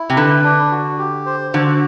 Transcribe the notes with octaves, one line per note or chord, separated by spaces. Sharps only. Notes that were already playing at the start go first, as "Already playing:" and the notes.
Already playing: E4
C3
D3 B4
D4
F#4
G4
C5
D3 F#4